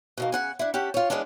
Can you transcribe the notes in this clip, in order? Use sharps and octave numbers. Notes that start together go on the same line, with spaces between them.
B2 D#3 A#3
C#3 F#5 G#5
D4 E4
C#4 G4 F#5 A5
F4 C#5
E3 G#3 B3 C#4 D4